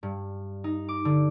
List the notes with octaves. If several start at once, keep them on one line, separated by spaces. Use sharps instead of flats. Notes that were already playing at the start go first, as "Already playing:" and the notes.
G2
D#4
D6
D3